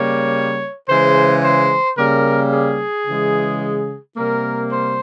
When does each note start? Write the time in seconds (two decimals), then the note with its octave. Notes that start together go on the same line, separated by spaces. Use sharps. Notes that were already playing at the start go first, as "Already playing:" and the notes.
Already playing: C#3 G3 A#3 C#5
0.88 C#3 E3 G#3 C5
1.43 C5
1.97 C#3 G3 A#3 A#4
2.52 G#4
3.07 C#3 E3 G#3
4.16 C3 G3 A#3 A#4
4.72 C5